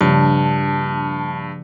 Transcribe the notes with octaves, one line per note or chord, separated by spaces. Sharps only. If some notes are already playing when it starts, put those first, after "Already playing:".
A#1 G2 C#3 A5